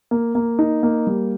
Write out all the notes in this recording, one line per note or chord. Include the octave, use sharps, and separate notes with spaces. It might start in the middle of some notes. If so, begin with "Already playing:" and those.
A#3
A#3
D#4
A#3
G3